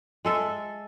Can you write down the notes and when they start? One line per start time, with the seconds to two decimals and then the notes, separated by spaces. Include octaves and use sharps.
0.25 G#3 A4 E5